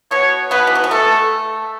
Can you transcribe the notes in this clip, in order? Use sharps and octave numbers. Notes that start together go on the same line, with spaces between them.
B2 B3 C#5
B2 B3 B4
E3
F#3
G#3
A3 A4